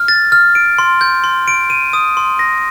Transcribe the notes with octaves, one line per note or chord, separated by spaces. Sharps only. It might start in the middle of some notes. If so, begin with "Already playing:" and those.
Already playing: F6
A6
F6
D7
C6
G6
C6
D7
D#7
D#6
C6
A#6